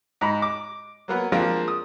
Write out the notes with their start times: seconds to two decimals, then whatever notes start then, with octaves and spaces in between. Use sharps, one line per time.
0.21 G#2 A#5 B5
0.42 D6
1.08 F#3 A#3 B3
1.32 F3 G#3 A#3 C4 D4 F4
1.68 D#6